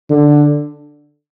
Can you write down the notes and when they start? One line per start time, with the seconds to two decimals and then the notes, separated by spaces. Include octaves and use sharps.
0.10 D3